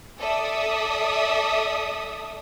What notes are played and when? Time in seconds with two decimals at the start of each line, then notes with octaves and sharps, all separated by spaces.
0.20 A4 D5 E5 D#6